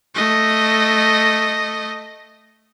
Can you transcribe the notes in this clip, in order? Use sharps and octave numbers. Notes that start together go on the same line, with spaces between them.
A3 D#5